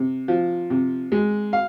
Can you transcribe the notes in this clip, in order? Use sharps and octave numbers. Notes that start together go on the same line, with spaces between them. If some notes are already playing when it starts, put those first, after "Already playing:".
Already playing: C3
F3
C3
G#3
F5